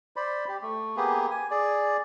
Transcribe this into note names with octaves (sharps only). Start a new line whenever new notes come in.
C5 D5 B5
G4
A3
A#3 B3 G4 G#4
G#5
G#4 D5